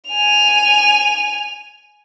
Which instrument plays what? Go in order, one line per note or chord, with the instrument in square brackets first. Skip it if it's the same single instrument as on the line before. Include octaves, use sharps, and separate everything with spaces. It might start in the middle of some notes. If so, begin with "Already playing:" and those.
[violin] G#5 F7